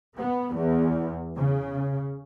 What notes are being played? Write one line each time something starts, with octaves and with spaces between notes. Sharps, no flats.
B3
E2
C#3